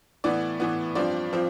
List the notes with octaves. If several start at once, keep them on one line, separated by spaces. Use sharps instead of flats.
A2 E3 B3 D5
A2 E3 B3
G2 F3 C4 D5
F3 C4